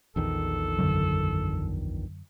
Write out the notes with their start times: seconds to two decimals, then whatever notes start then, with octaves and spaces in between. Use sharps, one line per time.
0.16 A#1 E2 D#3 A4
0.79 F#2 D3 F#3